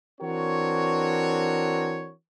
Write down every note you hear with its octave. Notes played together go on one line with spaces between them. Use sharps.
E3 C4 D4 F#4 A#4 C#5